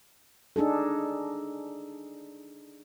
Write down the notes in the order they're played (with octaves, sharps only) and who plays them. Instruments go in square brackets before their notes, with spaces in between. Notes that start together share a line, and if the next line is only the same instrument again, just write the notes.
[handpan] D4 D#4 G#4 A4